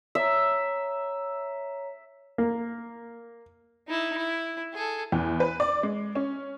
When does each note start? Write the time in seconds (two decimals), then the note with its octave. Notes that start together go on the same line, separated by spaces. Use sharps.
0.15 C#5 E5 A#5
2.38 A#3
3.88 D#4 E4
4.18 E4
4.74 G#4 A4
5.12 E2
5.40 B4
5.60 D5
5.83 G#3
6.15 C#4